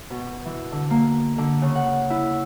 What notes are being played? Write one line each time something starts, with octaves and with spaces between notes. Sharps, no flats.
B2
E3
D3
A#3
D3
C#3
F#5
E4